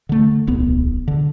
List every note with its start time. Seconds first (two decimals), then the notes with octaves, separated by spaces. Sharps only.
0.09 D3 A3
0.47 D1 B1 B3
1.08 D3